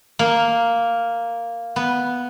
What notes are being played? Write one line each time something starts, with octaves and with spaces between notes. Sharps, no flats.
A#3
B3